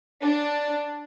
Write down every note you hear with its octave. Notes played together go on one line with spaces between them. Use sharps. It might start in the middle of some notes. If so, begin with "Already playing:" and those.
D4